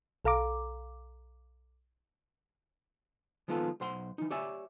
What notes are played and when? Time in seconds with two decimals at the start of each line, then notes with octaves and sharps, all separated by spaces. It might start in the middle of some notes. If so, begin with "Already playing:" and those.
0.25 B1 A4 F5 A#5 D6
3.48 D#3 F3 G#3 B3 F4 A4
3.81 B1 C5 F#5 C6
4.18 E3 D#4
4.30 G4 C#5 D5 E5 G#5